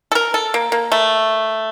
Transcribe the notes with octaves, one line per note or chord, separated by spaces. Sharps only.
A4
A#4
A4
A#3
A#3
A3